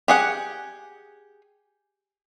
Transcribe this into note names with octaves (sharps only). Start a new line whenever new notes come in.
G4 G#4 F#5